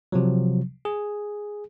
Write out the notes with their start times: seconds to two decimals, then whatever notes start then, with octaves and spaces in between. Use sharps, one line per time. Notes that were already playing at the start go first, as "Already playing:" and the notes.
0.12 C3 F3 F#3
0.85 G#4